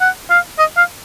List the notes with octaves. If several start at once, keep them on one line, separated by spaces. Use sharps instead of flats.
F#5
F5
D#5
F5